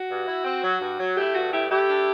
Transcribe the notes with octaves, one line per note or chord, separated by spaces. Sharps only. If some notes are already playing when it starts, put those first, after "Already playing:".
Already playing: F#4
G2
E4
C4
F#3
G2
F#3
A3 E4 G4
G2 F#4
A3 E4 G4
A3 E4 G4
D4